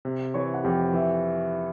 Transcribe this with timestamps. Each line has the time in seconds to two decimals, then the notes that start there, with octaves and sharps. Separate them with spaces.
0.05 C3
0.34 E3 C#5 C#6
0.54 F#5
0.64 F2 G4 G5
0.93 E3 E5